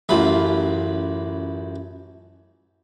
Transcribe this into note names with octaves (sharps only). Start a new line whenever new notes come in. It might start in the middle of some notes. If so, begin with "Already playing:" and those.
A1 F#2 F4 B5